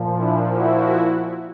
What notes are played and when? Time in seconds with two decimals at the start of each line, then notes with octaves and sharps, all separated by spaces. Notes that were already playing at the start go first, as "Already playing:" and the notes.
Already playing: A#2 F3
0.17 D4 E4
0.54 E4 F#4